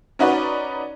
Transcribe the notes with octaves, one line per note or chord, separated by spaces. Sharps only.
C#4 D#4 F#4 B4 D5